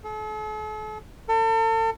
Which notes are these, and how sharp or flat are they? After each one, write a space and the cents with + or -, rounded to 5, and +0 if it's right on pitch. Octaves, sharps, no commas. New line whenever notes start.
A4 -45
A4 +40